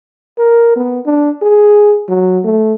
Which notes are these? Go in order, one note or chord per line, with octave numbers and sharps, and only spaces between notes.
A#4
B3
D4
G#4
F#3
A3